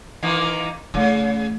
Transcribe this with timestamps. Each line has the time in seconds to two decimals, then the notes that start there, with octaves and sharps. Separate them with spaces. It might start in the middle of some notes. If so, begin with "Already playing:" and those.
0.23 D#3 E3 A#3
0.94 C#3 E3 A3